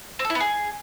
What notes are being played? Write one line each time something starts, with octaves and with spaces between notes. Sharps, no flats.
C4
A4
E4
B3
G#4